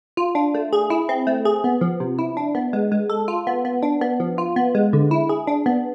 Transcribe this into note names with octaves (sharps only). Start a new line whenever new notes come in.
F4
D4
A3
G#4
E4
C4
A3
G#4
B3
F3
C3
E4
D4
B3
G#3
G#3
A4
F4
B3
B3
D4
B3
F3
F4
B3
G#3
D3
E4
G#4
D4
B3